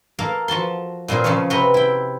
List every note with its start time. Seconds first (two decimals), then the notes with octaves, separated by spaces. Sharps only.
0.19 A#3 A4 A#4 F5
0.48 F3 F#4 A5 C6
1.08 A#2 C4 F4 G#4 A#4
1.24 C#3 F3 A3 C#4 G#4 C#5
1.50 C3 C4 F#4 B4 A#5 C6
1.74 E4 G5